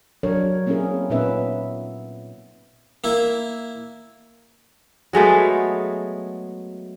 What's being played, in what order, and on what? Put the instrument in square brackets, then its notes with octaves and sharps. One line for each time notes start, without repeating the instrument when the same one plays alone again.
[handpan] F#3 D4 A#4 C#5
A#3 C4 C#4 E4 G#4 A#4
A#2 B3 C#4 D#4 B4 E5
[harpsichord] A#3 E4
[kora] F#3 G#3 A3 B3